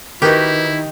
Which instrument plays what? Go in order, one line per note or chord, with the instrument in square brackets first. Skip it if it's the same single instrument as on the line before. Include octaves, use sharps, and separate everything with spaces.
[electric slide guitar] D#3 [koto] D#4 G4 [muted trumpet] E4 [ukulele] F#4 A#4 B4